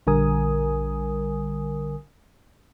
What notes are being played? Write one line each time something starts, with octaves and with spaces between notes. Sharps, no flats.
A#1 D3 G3 A#4 G#5 D#6